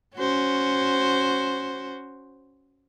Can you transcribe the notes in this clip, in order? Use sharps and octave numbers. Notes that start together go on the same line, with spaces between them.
C#4 F#4 C5